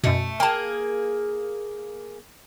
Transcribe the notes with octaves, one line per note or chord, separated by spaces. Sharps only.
F#2 B2 A3
A#3 G#4 G5 A5